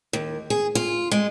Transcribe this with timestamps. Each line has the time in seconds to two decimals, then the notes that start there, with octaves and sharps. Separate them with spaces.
0.13 D#2
0.50 G#4
0.75 F4
1.11 G#3